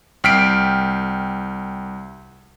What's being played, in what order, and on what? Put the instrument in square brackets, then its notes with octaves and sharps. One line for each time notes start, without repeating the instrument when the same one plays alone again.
[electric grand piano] C2 G5 F6 B6 C7 D7